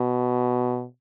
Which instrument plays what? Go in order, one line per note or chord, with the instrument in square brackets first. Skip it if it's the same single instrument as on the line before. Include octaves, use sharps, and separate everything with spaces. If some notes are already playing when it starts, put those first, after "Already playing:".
Already playing: [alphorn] B2